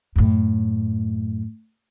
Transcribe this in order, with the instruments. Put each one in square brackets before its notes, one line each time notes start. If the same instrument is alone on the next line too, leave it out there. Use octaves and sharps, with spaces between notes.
[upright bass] F#2 A2